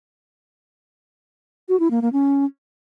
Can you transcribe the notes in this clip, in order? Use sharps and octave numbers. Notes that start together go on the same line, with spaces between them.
F#4
E4
A#3
A#3
C#4